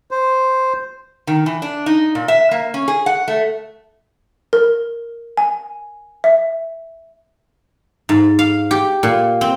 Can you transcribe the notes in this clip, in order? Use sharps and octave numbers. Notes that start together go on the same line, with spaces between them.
C5
D#3
E3
D4
D#4
A#2
E5
A#3
C#4
G#4
F#5
A3
A#4
G#5
E5
G#2
F5
G4
A#2
C4